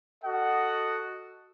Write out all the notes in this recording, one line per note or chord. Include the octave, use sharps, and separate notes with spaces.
F#4 A4 D#5 F#5